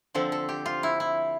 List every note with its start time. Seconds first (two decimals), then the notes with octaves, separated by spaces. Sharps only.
0.14 D3 F3 C4 A4
0.32 A4
0.49 G4
0.66 F4
0.83 E4
1.00 E4